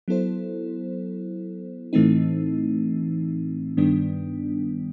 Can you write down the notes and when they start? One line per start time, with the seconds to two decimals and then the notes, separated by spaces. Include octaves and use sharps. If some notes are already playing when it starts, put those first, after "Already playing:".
0.08 F#3 B3 E4 A4 C5
1.93 A2 E3 A3 C4 D#4
3.77 G2 D#3 G3 B3 D4